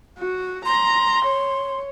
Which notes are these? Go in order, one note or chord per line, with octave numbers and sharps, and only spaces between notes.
F#4
A#5 C6
C#5